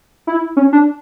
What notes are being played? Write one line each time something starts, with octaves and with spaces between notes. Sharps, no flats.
E4
C#4
D4